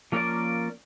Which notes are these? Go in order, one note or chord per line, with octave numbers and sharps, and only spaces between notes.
F3 A#3 C#4 F4 A#4 D5